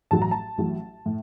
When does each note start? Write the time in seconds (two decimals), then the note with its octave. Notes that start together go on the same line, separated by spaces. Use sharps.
0.11 A1 A2 F#3 A5
0.22 A#5
0.31 A5
0.58 A1 A2 F#3
1.06 A2